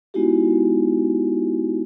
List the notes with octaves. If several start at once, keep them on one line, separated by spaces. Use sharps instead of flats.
G#3 B3 D#4 E4 F#4 G4